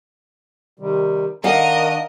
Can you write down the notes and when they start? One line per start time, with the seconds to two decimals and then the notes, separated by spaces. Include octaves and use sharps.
0.79 C3 D#3 G3
1.44 D#3 D4 A#4 D5 D#5 F5 F#5